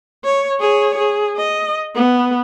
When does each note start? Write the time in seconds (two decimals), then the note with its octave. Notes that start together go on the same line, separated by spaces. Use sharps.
0.24 C#5
0.60 G#4 C#5
0.97 G#4
1.36 D#5
1.95 B3